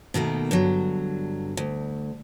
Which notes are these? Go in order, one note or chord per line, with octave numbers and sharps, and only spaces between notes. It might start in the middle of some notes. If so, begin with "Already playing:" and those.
B2 D#3 A3 A#3
G2 D3 F#3
D2